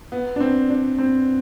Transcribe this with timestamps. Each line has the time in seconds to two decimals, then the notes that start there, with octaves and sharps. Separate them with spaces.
0.12 B3
0.36 D4
0.41 C4
0.70 D4
0.98 C4